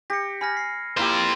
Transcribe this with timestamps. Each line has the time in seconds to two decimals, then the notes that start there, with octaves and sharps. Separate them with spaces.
0.10 G4 A#6 C#7
0.41 G#5 B5 F6 A#6
0.57 C7
0.97 A#3 C4 E4 F4 G4